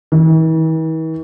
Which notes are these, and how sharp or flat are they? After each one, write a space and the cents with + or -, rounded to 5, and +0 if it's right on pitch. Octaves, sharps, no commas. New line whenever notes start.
E3 -45